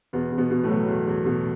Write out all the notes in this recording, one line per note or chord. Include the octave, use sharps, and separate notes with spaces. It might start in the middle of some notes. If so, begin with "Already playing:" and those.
E2 B2 B3
E2
B2 B3
B2
A2 A3
F#3
E2
E2
B2